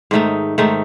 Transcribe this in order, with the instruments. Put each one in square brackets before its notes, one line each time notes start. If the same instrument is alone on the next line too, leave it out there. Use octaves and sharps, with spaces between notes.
[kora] G#2 D#3 A3 D#4
G#2 D#3 A3 D#4